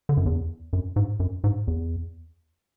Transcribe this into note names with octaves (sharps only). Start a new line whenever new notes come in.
D3
F#2
E2
F#2
G#2
F#2
G#2
E2